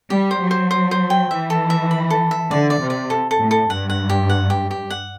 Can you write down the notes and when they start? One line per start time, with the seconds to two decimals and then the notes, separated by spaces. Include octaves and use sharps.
0.10 G3 G4
0.31 C5
0.40 F#3
0.51 C5
0.71 C5
0.91 C5
1.10 G5
1.31 E3 E5
1.50 A4
1.70 E5
1.91 B5
2.10 A4
2.31 E5
2.50 D3 D5
2.70 D5
2.81 C3
2.90 D5
3.10 A4
3.31 A4
3.40 A2
3.51 A4
3.70 G2 F#5
3.90 F#5
4.10 G4
4.30 F#5
4.50 G4
4.71 G4
4.90 F#5